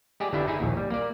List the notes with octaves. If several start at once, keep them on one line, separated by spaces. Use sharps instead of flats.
G#3 G4 G#4 D5
G1 G3 D4 E4 E5 G5
D#4 E4 G#4
A#1 D#2
G3
A#3 D5